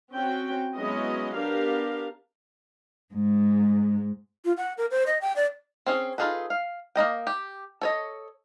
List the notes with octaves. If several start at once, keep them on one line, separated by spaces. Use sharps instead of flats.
C4 C#4 F#4 G5
F#3 G#3 B3 C#4 E4 D#5
B3 D4 G4 A#4 F5
G#2 G#3
F4
F#5
A#4
C5
D#5
G5
D5
C4 C#4 G#4
D#4 F4 G#4 A4 B4
F5
A#3 E4 D#5 G5
G4
A4 C#5 D#5